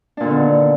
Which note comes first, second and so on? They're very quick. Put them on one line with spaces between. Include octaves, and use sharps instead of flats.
D4 A#2 D3 D#3 B3